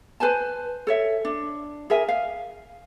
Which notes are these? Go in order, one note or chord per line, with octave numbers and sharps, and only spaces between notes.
B4 C5 G#5 A5
A4 C#5 E5
D4
G#4 A#4 E5 G#5
F5